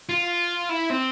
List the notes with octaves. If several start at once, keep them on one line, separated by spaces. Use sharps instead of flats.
F4
E4
C4